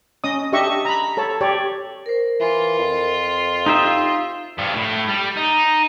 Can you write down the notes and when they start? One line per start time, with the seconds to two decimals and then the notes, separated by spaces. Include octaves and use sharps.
0.24 C#4 D#5 D#6
0.52 D4 G4 D#5 E5 C#6
0.85 A#5 B5
1.17 A4 C#5 A5
1.41 G4 C#5 D5
2.06 A#4 C5
2.40 E3 F4
2.78 F2
3.66 D#4 G4 E5 F5 C6
4.58 G2 F3
4.76 A2
5.08 G3
5.37 D#4